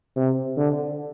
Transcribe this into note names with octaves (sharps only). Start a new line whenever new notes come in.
C3
D3